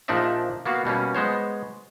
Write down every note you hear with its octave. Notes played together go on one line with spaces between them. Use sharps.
A#1 F3 D4 D#4 D5 E5
A#3 B3 F#4 F5
B2 G3 A#3 C#4
G#3 B3 C5 C#5